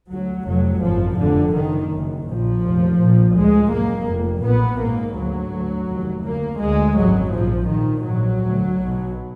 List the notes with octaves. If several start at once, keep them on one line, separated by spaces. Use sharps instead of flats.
D2 F#3
F1 F2 F#3
G#1 F#2 F3
F1 F2 D3
F#1 F#2 D#3
F#1 F#2
A#1 A#2 F3
F1 D#2
A#1 A#2
D2 G#3
F#1 F#2 A#3
F1 F2
B1 A#2 B3
G#1 G#2 A#3
D2 F#3
D2
F1 D#2
D2 A#3
D2 G#3
G#1 F#2 F#3
A#1 G#2 F3
A#1 A#2 D#3
A#1 G#2 F#3
D2
B1 B2